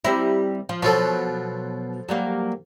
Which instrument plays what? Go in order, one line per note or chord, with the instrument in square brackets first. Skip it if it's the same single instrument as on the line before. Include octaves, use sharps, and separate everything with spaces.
[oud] G3 C4 E4 [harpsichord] A#5
[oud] F3
[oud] B2 F#3 [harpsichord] F3 F4 A4
[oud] F#3 G3 A#3